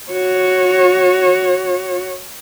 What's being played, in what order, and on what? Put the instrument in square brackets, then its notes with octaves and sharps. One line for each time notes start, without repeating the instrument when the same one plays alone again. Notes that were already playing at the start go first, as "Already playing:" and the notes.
[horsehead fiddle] F#4 C#5